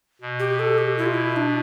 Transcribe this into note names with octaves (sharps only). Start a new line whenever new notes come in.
B2
G4
A4
G4
E4
F4
E4
D4